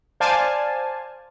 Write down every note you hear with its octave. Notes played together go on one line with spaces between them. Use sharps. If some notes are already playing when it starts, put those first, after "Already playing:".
C5 D5 F5 G#5 A5